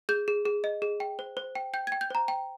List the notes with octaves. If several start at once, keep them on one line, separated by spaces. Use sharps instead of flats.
G#4 G6
G#4
G#4
D#5
G#4
G5
C5
C5
G5
G5 G6
G5 G#6
G6
C5 A#5
G5